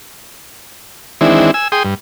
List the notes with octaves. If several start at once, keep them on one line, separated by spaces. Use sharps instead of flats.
D#3 E3 G#3 C4 D4 E4
G#5 E6
G#4 G5 C6 D#6
G2